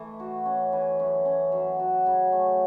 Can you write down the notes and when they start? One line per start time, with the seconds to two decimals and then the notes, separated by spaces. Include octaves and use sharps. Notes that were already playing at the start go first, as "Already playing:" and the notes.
Already playing: E3 A3
0.20 F#4
0.46 C#4
0.73 E3
1.00 F#2
1.25 C#4
1.52 F#3
1.80 F#4
2.06 C#3
2.32 A3